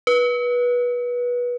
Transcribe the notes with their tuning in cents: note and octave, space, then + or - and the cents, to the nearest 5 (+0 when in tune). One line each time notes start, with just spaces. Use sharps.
B4 -20